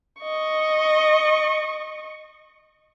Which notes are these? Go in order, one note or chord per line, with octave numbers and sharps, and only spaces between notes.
D#5 C#6